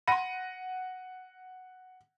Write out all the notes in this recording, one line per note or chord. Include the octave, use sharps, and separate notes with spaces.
F#5 B5 C6 A#6 D#7